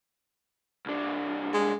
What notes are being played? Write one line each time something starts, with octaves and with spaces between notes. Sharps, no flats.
C2 D4
G#3